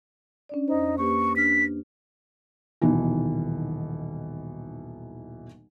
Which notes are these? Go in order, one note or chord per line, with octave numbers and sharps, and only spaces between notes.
C#4 D4 D5
F2 D#4 C5
A#3 G4 B4 C#6
D4 F6 B6
D#1 B1 B2 D#3 E3